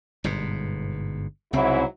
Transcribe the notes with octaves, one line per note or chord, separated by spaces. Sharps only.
G1 G#2 B2
C2 G#2 C#3 F#3 C4 E4